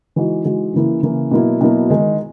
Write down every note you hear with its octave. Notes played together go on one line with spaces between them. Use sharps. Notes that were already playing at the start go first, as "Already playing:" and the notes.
E3 G#3 D#4 F#4
E3 G#3 D#4 F#4
C#3 E3 A#3 E4
C#3 E3 A#3 E4
B2 F#3 A#3 E4
B2 F#3 A#3 E4
D#3 G#3 D#4